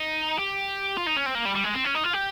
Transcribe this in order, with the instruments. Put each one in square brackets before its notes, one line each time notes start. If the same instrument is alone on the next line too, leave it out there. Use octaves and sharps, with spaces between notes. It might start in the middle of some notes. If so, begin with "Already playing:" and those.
Already playing: [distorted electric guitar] D#4
G4
F4
D#4
C#4
C4
A#3
G3
G3
G#3
C4
C#4
D#4
F4
G4